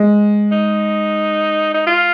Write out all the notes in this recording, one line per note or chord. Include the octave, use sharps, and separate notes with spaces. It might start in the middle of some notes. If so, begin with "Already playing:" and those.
Already playing: G#3
D#4
D#4
F4